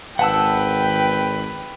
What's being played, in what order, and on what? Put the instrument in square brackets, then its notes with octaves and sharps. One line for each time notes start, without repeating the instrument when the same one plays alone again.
[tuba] G#1 [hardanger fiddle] B4 [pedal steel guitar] F#5 A5 E6 [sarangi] G5